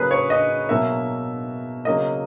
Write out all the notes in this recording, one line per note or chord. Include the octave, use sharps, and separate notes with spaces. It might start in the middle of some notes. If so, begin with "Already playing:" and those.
Already playing: C#3 F#3 A#3 G#4 B4
C#5
D#5
B2 F#3 A#3 E5
C#3 F#3 A#3 D#5